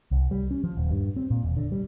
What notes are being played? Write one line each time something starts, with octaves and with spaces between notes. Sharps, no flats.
C2
G3
C#4
F3
D#1
G2
C4
A#2
E1
D3
G3